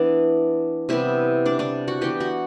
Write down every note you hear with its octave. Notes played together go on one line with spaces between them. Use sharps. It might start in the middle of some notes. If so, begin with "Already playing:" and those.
Already playing: E3 B3 D4 D5
C3 G3 B3 E4 E5
D4 D5
D4 D5
F#4 F#5
E3 B3 G4 G5
F#4 F#5